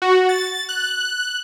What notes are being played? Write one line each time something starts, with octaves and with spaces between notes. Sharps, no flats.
F#4
A6
F#6